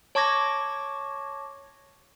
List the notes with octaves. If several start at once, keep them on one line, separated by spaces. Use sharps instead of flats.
C#5 A5 C#6 D6 G#6 A#6